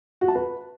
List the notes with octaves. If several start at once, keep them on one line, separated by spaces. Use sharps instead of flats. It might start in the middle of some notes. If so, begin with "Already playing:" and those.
F#4
A5
B4